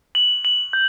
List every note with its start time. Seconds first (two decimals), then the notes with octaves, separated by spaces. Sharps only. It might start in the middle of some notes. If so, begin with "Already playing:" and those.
0.15 F#7
0.45 F#7
0.73 G6